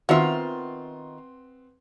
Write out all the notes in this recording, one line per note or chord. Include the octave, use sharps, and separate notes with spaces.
D#3 B3 C4 F4 F#4 E5 C6